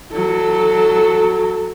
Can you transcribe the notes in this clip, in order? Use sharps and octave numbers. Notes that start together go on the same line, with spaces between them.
F#3 A4